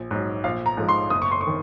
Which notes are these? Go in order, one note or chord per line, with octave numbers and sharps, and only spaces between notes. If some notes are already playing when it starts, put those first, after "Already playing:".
Already playing: A#1
G#2 F#3
A#1 F5
A#5
G#2 F3 G#3
C6
F#1 D#6
C#6
C6
C#6
D#3